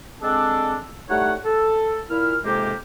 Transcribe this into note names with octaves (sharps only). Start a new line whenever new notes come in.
G#3 C4 D4 A4
A2 G3 A3 D#4 C#5 F#5
A4
A#2 E4 F6
F2 G#2 C3 G#3 A#3 G4